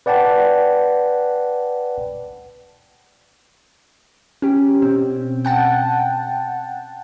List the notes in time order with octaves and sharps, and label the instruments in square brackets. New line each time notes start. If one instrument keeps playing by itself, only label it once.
[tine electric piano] B4 D5 F#5 G5 A5
[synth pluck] C#4 G4
B2 C4
F#5 G5 A5